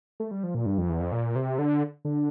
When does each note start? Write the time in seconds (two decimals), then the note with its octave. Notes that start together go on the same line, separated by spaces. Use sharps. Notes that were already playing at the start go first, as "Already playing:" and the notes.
0.20 A3
0.31 G3
0.43 F3
0.54 A#2
0.66 G2
0.78 F2
0.89 E2
1.00 F2
1.12 A#2
1.36 C3
1.59 D3
2.05 D3